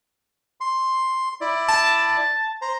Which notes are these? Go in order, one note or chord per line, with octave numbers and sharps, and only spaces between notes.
C6
E4 D5
A5
C5 A#5